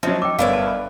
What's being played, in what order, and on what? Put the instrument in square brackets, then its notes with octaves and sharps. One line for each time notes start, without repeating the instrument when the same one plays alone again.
[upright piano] F3 F#3 [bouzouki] D#4 [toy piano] E5
[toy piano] G5 D6 [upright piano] E6
[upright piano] G1 B3 C#5 [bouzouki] A#4 D5 E5 [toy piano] F5
[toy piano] A5
[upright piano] B4